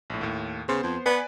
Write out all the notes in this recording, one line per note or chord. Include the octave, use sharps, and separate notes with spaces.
A#1 A2
D#2 A2
C#3 B3 C5 C6
F2
B3 B4 D5 G#5